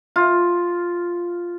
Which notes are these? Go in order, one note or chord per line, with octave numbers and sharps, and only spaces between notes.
F4